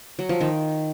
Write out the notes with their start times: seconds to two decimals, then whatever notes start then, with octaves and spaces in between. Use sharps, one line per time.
0.19 F#3
0.29 F3
0.41 D#3